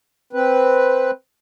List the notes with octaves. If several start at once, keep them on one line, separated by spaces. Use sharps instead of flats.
C4 B4